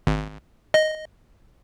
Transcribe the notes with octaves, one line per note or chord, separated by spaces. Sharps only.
G#1
D#5